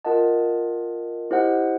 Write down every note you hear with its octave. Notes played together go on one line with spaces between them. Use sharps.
F4 A#4 D#5 F#5 A5
E4 G4 C5 D#5 F#5